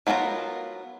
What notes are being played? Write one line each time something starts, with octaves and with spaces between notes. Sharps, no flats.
F#3 B3 F4 A4 A#4